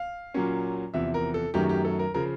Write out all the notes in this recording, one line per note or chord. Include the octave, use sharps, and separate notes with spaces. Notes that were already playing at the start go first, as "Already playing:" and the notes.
Already playing: F5
A#2 F#3 A#3 C#4
E2 C3 F3 E5
A#4
A4
F#2 D#3 F#3 A3 C#4 G4
G4
A4
A#4
C#3 F3 A#4